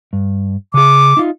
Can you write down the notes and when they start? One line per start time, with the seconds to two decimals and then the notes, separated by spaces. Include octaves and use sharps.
0.13 G2
0.74 C#3 G#4 D6
1.17 D#4 F4